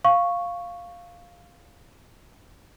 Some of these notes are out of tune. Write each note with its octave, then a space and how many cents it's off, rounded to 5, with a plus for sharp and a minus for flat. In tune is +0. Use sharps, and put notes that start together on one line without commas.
F5 +0 C#6 +0